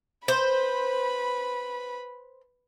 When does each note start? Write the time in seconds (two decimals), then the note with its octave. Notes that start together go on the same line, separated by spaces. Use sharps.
0.28 B4 C5 B5